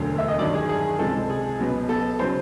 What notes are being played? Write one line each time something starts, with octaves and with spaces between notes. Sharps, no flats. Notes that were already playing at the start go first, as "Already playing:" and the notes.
Already playing: E1 D2 D3 F#3 A3
E5
D#5
G2 D#3 F#3 D5
G#4
G#4
C#2 C3 F3 G#3 A4
G#4
C#2 B2 F#3 B3
A4
C#3 F#3 C5